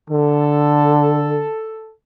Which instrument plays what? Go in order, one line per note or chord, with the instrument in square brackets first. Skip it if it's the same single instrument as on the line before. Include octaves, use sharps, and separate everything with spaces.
[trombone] D3 [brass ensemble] A4